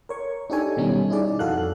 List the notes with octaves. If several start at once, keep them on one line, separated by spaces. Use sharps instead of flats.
A#4 C#5 C#6
D4 D#4 G4 A4 C#5 G#5
B2 D#3 G3 C#4 D#4
D#4 E4 G#4 D5
F2 F#4 A4 F5 F#6